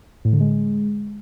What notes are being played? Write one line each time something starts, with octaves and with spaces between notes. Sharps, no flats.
A2
D3
G#3